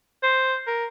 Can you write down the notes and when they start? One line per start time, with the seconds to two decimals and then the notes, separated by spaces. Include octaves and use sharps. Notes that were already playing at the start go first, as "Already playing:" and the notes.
0.23 C5
0.67 A#4